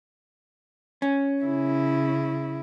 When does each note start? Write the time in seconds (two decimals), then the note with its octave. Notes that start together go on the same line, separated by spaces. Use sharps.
1.02 C#4
1.42 C#3 E4